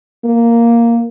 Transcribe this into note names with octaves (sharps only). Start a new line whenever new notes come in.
A#3